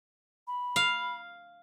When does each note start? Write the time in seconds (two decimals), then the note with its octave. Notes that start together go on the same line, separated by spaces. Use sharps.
0.47 B5
0.76 F5